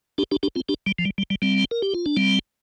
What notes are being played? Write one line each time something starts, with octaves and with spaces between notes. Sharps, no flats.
D4 G4
D4 G4
D4 G4
C4 F4
D4 G4
G3
F3
G3
G3
G3
G3 C4
A#4
G4
F4
D4
G3 C4